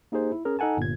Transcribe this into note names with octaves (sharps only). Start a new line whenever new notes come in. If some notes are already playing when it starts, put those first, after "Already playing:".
A#3 D#4 G4 G#4 C5
E4
C#4 G#4 A#4
D#4 A4 F#5 G#5 A5
G1 A#2 G#6